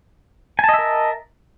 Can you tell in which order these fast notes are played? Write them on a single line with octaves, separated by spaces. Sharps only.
G#5 A5 D#5 E5 A#4